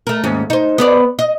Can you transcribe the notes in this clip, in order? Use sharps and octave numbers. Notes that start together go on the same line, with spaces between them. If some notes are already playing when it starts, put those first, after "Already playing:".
A3 A#4
D#2 G#2 C#4
D#4 C5
B3 B4 D5
D#5